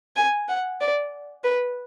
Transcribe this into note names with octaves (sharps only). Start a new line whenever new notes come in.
G#5
F#5
D5
B4